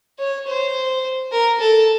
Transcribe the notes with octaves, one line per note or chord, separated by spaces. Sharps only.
C#5
C5
A#4
A4